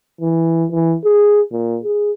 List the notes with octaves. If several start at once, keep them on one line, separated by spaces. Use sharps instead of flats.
E3
E3
G#4
A#2
G#4